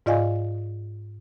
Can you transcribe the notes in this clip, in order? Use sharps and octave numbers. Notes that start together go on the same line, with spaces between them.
G#2 F4 D5 D#5 F5 G#5